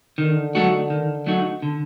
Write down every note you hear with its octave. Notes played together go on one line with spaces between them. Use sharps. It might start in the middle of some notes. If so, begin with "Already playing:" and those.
D3 D#3
F#3 A3 D#4 F#4
D#3
F#3 A3 D#4 F#4
D3